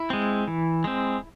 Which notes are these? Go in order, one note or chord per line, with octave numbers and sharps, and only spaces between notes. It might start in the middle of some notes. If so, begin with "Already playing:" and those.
Already playing: E4
G#3 C4
E3
G#3 C4